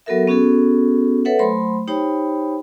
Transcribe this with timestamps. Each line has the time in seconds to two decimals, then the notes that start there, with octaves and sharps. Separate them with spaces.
0.06 F#3 B3 F#4 A4 A#4 E5
0.28 B3 C#4 F#4 G#4 A4
1.25 A4 B4 C#5 E5 F#5
1.39 F#3 A3 C5 B5 C6
1.88 D#4 G4 C5 C#5 G5 B5